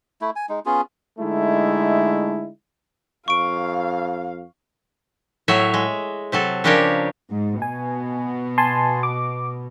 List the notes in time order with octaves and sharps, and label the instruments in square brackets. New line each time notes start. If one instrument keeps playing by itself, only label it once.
[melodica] A3 E4
G#5
G#3 D#4
B3 C#4 F4 G#4
[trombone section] D3 G#3 A3 D#4 E4
[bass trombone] F2 [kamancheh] F5 [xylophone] C#6 D7
[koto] A2 F#3 C#5 E5
G#3
C3 F#3 A4
C#3 F3 D4 G4 A#4 C#5
[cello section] G#2
[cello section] B2 [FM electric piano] G#5
[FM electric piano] G#5 A5 C6
D6